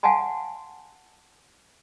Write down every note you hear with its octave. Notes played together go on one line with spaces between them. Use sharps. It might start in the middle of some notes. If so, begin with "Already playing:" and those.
F5 F#5 G#5 A5 C6